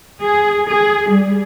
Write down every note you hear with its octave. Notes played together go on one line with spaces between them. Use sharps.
G#4
G#4
G3